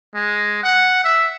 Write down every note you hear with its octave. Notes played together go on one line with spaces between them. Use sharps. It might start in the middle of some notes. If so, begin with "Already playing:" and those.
G#3
F#5
E5